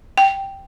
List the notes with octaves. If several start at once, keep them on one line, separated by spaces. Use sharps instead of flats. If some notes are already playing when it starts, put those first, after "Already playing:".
G5